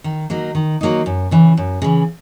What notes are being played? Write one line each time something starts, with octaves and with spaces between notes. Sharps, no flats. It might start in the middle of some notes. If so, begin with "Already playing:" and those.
D#3
F#3 A#3 D#4
D#3
F#3 A#3 D#4
F#2
C#3 E3
F#2
C#3 E3